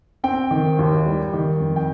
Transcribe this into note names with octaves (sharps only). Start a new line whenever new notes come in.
C4 G5
D#3
D#2
G3
D#3
F2
G5